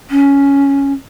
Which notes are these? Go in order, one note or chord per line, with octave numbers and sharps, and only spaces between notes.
C#4